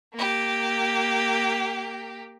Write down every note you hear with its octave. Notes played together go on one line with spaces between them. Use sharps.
A#3 G4